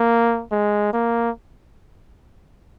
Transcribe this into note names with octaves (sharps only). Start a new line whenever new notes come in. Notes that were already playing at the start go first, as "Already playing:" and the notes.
Already playing: A#3
G#3
A#3